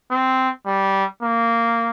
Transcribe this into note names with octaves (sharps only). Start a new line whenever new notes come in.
C4
G3
A#3